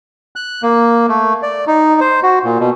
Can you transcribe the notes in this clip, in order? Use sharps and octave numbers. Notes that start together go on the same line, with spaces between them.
F#6
A#3
A3
D5
D#4
C5
F#4
A#2
B2